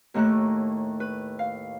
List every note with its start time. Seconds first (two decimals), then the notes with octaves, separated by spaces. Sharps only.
0.14 D#2 A2 A3 A#5 F#6
1.00 B4
1.39 F5